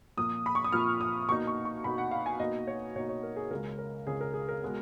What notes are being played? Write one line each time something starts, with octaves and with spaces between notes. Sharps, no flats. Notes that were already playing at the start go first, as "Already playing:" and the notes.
A#2 F3 A#3 D#6
B5
C#6
D#6
A#2 F3 A#3 F6
D#6
B2 A#3 D#4 C#6
C#6
C#6
B2 A#3 D#4 B5
F#5
F5
G#5
B2 A#3 D#4 D#5
C#5
B2 A#3 D#4 C#5
C#5
A#4
G#4
C#2 C#3 G#3 A#4
A#4
C#2 C#3 G#3 G#4
A#4
G#4
A#4
B2 G#3 B3